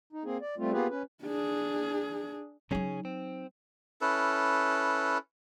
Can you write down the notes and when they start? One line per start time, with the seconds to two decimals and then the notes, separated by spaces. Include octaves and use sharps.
0.13 D#4
0.24 A#3 C4 G#4
0.41 D5
0.58 G3 A3 C4 F4
0.72 A#3 B3 F4 G4 G#4 B4
0.90 C#4 B4
1.23 D4 G#4
2.71 C#3 F#3 C#4 D#4 G#4
3.05 C4
4.01 C#4 E4 A4 B4